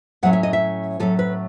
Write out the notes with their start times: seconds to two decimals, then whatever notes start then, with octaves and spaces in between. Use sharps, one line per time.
0.23 A2 F#3 A3 C#4 F#5
0.33 E5
0.43 D#5
0.53 E5
1.00 A2 F#3 A3 C#4 A4
1.19 B4